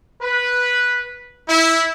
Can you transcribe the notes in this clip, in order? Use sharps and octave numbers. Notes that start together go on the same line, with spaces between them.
B4
E4